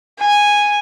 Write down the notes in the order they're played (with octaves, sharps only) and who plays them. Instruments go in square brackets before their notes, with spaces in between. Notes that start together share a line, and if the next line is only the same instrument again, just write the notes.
[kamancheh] G#5